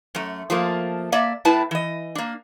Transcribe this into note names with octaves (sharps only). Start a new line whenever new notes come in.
F#2 A3
F3 A3 A#3
A#3 D5 E5
A2 A3 E4 B4 A5
E3 D#5
A#3 D4